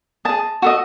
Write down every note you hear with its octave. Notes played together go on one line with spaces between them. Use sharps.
G#4 D#5 A5
F#4 A4 D#5